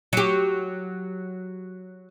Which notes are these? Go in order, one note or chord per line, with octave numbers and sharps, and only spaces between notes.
F#3 G4